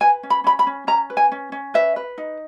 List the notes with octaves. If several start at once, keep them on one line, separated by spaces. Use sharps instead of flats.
B4 G#5
C#4
B5
C#4 B5
B5
C#4
C#4 A#5
B4
G#5
C#4
C#4
B4 E5
B4
D#4